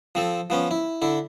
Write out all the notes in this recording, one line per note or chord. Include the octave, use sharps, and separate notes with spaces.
F3 C4 A4
F3 B3 C#4
E4
D3 E4